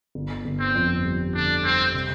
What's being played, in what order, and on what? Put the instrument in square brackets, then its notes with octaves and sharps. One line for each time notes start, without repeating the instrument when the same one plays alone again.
[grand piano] G1
G1
[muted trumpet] C4
[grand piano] F2
G3
[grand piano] D3 [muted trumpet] D4
[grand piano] G3 [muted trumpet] C4
[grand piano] C3